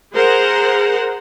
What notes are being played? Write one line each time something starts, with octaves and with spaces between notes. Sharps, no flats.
G#4 A#4 C5 F#5